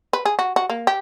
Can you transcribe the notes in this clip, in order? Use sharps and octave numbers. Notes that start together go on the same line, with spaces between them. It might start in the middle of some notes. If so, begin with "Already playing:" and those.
B4
G#4
F#4
F#4
A#3
G4